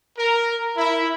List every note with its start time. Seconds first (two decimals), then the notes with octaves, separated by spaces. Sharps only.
0.18 A#4
0.77 E4